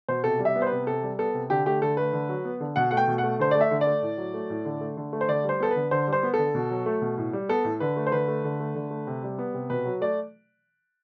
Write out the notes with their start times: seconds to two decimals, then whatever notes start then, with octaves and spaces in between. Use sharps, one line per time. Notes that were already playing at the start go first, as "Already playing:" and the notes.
0.08 B2 C5
0.24 C3 A4
0.39 G3
0.45 E5
0.56 B3
0.62 C5
0.67 C3 B4
0.87 C3 A4
1.03 G3
1.19 B3 A4
1.34 C3
1.50 D3 G4
1.66 A3 G4
1.82 D3 A4
1.97 A3 B4
2.13 D3
2.29 F#3
2.45 B3
2.60 D3
2.76 B2 F#5
2.91 A3 F#5
2.97 G5
3.08 B2
3.18 F#5
3.24 A3
3.39 D3 C5
3.51 A3 D5
3.61 E5
3.71 D3
3.81 D5
3.87 A3
4.02 A2
4.18 F#3
4.34 A3
4.50 A2
4.65 D3
4.81 A3
4.97 D3
5.13 A3
5.21 C5
5.28 D3 D5
5.44 G3 C5
5.60 B3 A4
5.71 D3 B4
5.91 D3 C5
6.07 G3
6.13 C5
6.23 B3
6.34 D3 A4
6.55 B2
6.71 F#3
6.86 A3
7.02 B2
7.18 A2
7.33 G3
7.49 B3 A4
7.65 A2
7.80 D3 B4
7.96 A3
8.07 C5
8.12 D3 B4
8.28 A3
8.44 D3
8.60 A3
8.75 D3
8.91 A3
9.07 C3
9.23 G3
9.38 B3
9.54 C3
9.70 B2 B4
9.85 F#3
10.01 A3 D5